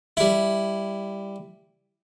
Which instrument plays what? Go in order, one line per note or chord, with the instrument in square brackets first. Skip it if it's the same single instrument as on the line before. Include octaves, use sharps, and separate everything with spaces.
[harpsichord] G3 E4